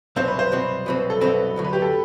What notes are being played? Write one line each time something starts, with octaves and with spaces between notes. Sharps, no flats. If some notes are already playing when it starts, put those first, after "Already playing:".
C2 B2 F#3 C4 C5
B4
C5
C2 B2 F#3 C4
C2 B2 F#3 C4 B4
A4
C2 B2 F#3 C4 B4
D2 C3 F#3
B4
G4
A4